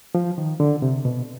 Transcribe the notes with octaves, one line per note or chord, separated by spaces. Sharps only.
F3
D#3
D3
C3
B2